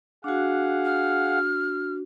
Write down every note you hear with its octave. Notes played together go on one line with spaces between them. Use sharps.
D4 F#4 G#4 F5 F#5
F6